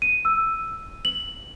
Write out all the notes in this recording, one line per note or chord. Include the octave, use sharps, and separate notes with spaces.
D#7
E6
F#7